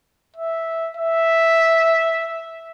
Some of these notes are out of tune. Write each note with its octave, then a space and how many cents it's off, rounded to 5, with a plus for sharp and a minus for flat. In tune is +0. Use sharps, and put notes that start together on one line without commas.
E5 -5
E5 -5